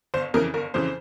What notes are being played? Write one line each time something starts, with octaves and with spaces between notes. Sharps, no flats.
G1 C5
F2 C#3 E3 A#4
G1 A#4
F2 C#3 E3 C5